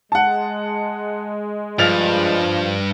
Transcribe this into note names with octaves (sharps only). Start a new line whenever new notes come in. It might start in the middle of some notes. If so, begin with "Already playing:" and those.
G#3 F#5 A5
G2 F3 F6 A6 F7